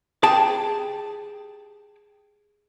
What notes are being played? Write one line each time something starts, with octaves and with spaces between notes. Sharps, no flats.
G4 G#4 G5 A5